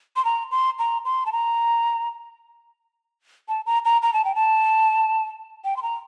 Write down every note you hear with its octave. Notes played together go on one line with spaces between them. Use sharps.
C6
A#5
C6
A#5
C6
A5
A#5
A5
A#5
A#5
A#5
A5
G5
A5
G5
C6
A#5